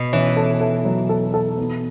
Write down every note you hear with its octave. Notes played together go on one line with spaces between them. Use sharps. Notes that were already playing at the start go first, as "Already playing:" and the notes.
Already playing: B2
E3 C#4
A4
A4
F#3
A4
A4
B3